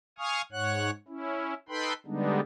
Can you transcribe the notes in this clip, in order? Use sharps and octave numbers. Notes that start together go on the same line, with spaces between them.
F5 G#5 C#6 D#6 F6
G#2 C#5 F#5 F#6
C#4 E4
D#4 A4 B4 G5 B5 C6
D3 G3 G#3 B3 D4 D#4